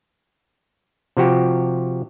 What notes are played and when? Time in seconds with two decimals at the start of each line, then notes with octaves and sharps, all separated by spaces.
1.17 C3 F3 F#4 G4